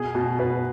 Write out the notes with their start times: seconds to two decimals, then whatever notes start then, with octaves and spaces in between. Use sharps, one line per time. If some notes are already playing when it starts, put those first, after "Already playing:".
Already playing: B2 G#4
0.15 B2
0.39 B2 B4